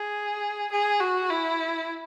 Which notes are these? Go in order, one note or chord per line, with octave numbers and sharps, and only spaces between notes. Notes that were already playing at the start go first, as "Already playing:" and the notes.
Already playing: G#4
G#4
F#4
E4